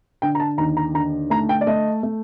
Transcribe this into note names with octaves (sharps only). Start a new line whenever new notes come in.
D3 G5
A#5
A5
D#2 A#5
A#5
D3 A#5
A3 A#5
G5
D5
A3 D#5
A3